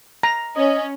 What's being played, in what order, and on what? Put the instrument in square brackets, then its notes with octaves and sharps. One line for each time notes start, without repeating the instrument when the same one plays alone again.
[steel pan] A#5
[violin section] C#4 [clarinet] D#5